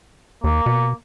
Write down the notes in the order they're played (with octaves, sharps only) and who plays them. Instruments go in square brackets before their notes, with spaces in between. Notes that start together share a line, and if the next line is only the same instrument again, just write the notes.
[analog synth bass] D#2 [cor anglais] A#3
[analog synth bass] B2